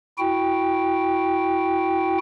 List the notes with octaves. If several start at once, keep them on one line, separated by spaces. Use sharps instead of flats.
E4 F#4 G5